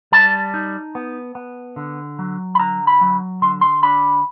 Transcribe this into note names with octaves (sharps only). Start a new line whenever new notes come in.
G3 A5
D#4
B3
B3
D3
F#3
B5
D3 A#5
B5
F#3
D3 C6
C6
D4 B5